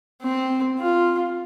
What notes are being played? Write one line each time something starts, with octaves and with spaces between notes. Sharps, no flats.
C4
F4